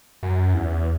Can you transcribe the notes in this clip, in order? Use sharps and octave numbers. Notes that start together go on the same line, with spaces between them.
F#2
E2